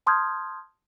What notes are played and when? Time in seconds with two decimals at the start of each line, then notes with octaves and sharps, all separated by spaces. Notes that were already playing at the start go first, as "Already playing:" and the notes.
0.06 A5 C6 D#6 F6 G6 G#6